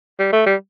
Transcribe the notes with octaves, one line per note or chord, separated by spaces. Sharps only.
G3
A3
G3